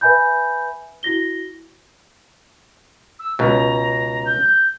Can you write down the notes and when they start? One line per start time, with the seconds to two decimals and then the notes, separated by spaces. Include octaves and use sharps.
0.01 B4 E5 G#5 B5 G6
1.03 E4 F#4 A#6 G7
3.19 E6
3.39 C#2 B2 A#5
4.25 G6